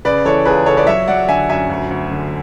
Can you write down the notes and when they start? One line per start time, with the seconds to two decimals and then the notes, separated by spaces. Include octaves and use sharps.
0.05 C#3 B4 D5
0.25 E3 A4 C#5
0.45 C#2 G#4 B4
0.66 C#2 A4 C#5
0.77 B4 D5
0.87 F#3 C#5 E5
1.08 F#3 D5 F#5
1.28 D3 E5 G#5
1.49 F#2 E5 G#5
1.69 D2
1.90 D2
2.11 D3